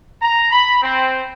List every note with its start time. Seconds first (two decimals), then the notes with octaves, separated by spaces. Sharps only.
0.22 A#5
0.51 B5
0.83 C4